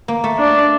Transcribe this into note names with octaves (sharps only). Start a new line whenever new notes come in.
A#3
A3
D4